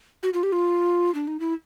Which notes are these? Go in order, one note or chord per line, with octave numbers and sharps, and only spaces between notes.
F#4
F4
G4
F4
D4
D#4
E4